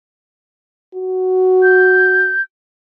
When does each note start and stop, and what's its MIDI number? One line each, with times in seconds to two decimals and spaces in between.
0.95 2.34 66
1.62 2.42 91